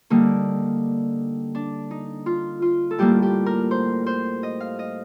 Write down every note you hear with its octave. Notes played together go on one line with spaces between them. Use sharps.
D3 G3 A#3 D#4
D4
D#4
F4
F4
A4
A2 G3 A#3 G4
G4
A#4
C5
C5
D#5
F5
D#5